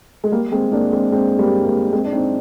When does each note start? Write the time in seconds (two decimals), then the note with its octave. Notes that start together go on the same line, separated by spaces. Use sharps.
0.24 G#3
0.32 G3 A#3
0.52 G#3 C4
0.72 A#3 D4
0.92 G#3 C4
1.12 G#3 C4
1.39 G3 A#3
1.66 G3 A#3
1.93 G#3 C4
2.05 D4
2.13 C4 D#4